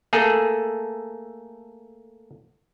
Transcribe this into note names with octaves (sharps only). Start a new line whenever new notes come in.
A3 A#3 G#4 A4